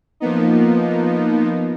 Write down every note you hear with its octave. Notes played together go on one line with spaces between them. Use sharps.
F3 A#3 B3 D#4